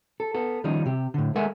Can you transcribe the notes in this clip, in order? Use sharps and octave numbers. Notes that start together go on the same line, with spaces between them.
A4
B3 A4
D#3 F3 G3 C#4 D#4
C3 G4
A2 D3
G#3 A4 A#4 E5 F#5 G#5